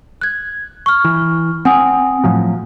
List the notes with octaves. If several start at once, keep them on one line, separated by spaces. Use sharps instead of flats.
F#6 G#6
C#6 F6
E3
C4 F#5 G#5 D#6
A2 F3 F#3